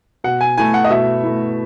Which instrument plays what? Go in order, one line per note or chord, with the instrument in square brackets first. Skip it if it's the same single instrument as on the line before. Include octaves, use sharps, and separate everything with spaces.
[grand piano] B2 [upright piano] F#5
[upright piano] G#5
[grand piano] A3 E4 [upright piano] G#5
[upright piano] F#5
D#5
[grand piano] B2 [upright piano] E5
[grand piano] A3 E4